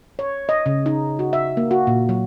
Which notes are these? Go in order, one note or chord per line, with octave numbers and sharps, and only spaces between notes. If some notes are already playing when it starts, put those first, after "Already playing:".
C#5
D#5
C#3
D#4
F#4
E5
A#3
F#4
A#2
F#3